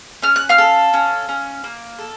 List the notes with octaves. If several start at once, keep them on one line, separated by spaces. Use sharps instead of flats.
C#4 F6
F#6
F5 F6
A4
C#4
C#4
A#3
A4